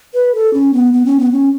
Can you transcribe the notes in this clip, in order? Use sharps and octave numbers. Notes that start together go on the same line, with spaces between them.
B4
A4
C#4
B3
B3
C#4
B3
C#4